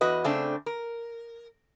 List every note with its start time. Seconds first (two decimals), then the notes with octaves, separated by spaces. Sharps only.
0.01 E2 F#4 B4 D#5
0.24 C#3 A3 C4 D4
0.66 A#4